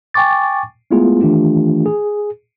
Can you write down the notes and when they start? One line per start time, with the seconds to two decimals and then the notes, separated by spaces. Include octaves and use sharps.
0.14 G5 G#5 C#6 D6 A6
0.91 G#3 A3 B3 E4 F4 G#4
1.22 D#3 E3 A3 D4 F4 G4
1.86 G#4